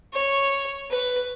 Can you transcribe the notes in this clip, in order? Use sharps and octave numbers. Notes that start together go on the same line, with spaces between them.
C#5
B4